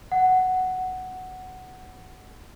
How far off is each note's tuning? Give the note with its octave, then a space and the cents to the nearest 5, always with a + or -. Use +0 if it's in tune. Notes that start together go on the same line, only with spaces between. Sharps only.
F#5 +5